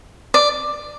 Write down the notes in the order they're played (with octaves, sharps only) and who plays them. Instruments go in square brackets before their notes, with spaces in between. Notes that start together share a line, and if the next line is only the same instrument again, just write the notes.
[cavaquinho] D5